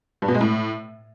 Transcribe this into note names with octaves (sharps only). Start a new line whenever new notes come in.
G2
B2
G#3
A2